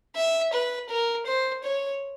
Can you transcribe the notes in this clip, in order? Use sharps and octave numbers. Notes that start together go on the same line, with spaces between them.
E5
B4
A#4
C5
C#5